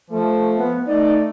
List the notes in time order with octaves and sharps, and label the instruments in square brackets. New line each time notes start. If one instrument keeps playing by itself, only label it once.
[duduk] F3 [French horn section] A3
[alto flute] B3
[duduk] A3 [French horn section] D#4 [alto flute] D5